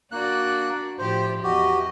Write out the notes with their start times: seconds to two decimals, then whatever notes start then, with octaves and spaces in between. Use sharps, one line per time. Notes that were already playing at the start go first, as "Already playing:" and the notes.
0.12 A#3 D4 F#4 D5 F#6
0.99 A2 F3 G4 C5
1.44 E2 F#4 G4 D#5